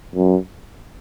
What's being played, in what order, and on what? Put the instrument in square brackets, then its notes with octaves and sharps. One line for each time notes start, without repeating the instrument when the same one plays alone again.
[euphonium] F#2